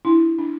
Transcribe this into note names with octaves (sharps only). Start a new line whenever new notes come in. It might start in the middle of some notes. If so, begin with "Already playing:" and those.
D4 E4
D4